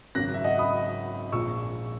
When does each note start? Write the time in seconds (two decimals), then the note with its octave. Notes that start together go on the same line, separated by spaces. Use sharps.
0.15 G#1 F#2 C#3 F#3 F#6 A#6
0.34 E5
0.44 D#5 F#5
0.59 B5 D#6
1.32 A#1 A#2 G#3 C#6 E6